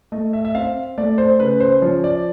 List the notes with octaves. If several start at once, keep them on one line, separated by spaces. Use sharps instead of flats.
A3 D#5
E5
E5
C4 F5
A3 D5
C5
C#3 B4
C5
F3 C#5
D5